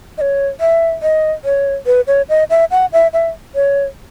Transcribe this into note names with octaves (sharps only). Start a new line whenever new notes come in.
D#5
C#5
E5
D#5
C#5
B4
C#5
D#5
E5
F#5
E5
E5
C#5